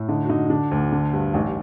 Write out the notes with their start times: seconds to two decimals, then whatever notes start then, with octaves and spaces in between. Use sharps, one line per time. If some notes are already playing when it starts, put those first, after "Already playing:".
Already playing: A2
0.09 D3 D#4
0.25 F#4
0.29 D3 D#4
0.50 D3 D4
0.71 D2
0.92 D3
1.13 G2
1.33 A1 D#4